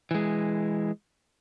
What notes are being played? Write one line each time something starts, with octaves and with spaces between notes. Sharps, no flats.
E3 G#3